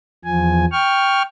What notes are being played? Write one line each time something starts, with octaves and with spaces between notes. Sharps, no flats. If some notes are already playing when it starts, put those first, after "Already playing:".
E2 F3 G#5
G5 C#6 F6